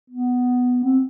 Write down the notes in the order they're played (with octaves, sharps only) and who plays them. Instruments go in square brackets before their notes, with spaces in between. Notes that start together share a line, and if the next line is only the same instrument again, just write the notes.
[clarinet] B3
C4